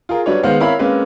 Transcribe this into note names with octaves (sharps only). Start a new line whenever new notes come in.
F4 G#4 A#4
F#3 G3 D4 B4 C#5
D#3 G#3 B3 C5 F5
C4 E4 A#4 C#5 F5 B5
G#3 A#3 C4 C#4 B4